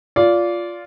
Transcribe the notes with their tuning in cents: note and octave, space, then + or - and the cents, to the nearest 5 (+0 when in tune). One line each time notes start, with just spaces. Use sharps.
F4 +0 D5 -20